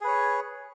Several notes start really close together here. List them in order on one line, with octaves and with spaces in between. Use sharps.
G#4 B4 C#5